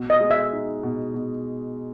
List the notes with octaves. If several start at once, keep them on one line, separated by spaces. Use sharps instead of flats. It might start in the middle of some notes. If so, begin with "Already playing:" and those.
Already playing: B2
D#5
G#3
E5
D#4
B2
B2